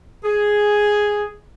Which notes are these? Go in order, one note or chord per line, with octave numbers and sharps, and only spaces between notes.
G#4